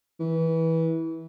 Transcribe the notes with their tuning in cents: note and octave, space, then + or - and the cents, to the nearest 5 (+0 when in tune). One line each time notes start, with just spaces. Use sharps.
E3 -20